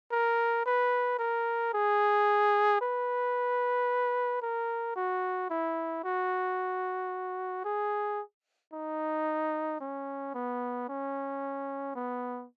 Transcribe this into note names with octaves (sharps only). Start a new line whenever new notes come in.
A#4
B4
A#4
G#4
B4
A#4
F#4
E4
F#4
G#4
D#4
C#4
B3
C#4
B3